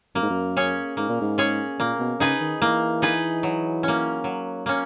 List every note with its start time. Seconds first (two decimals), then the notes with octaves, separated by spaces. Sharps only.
0.15 F#2 A#3
0.22 G#2
0.30 F#2
0.57 C#4 G#4 C#5
0.97 G#2 A#3
1.09 A#2
1.22 G#2
1.38 C#4 G#4 C#5
1.79 A#2 A#3
1.99 B2
2.20 C#3 D#4 G#4 B4
2.41 D#3
2.61 E3 A#3
3.02 D#4 G#4 B4
3.43 F#3
3.83 A#3 C#4
4.24 F#3
4.66 A#3 C#4